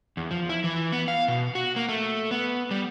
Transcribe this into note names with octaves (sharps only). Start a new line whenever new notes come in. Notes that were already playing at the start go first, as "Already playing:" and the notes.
E2
F3
E4
E3
B3
F5
B2
F#4
A#3
A3
B3
G3